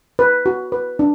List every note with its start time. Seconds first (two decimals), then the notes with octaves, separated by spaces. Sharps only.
0.19 B4
0.46 F#4
0.72 B4
0.99 D4